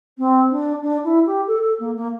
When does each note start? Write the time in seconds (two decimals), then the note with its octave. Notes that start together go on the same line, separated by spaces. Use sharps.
0.18 C4
0.50 D4
0.82 D4
1.04 E4
1.26 G4
1.47 A4
1.63 A4
1.79 A#3
1.96 A#3